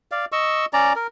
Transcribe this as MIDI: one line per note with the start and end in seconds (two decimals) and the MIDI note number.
0.12 0.25 74
0.12 0.25 77
0.32 0.66 75
0.32 0.66 85
0.32 0.66 88
0.73 0.93 61
0.73 0.93 74
0.73 0.93 82
0.96 1.07 70